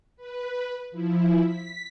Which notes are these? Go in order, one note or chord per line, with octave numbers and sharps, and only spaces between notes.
B4
F3 E4
B6